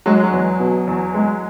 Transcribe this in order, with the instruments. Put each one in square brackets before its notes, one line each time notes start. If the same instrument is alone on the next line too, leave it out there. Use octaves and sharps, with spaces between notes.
[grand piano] F#3 [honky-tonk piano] G#3
[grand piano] F#3
[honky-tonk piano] E2
B2
E2
G#3